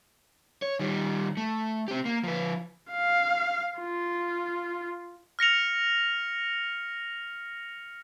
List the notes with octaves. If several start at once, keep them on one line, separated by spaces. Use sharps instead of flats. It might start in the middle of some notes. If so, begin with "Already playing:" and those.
C#5
D#3 G3
A3
C4 G4
A#3
F3 B4
F5
F4
F6 A#6 C#7 F7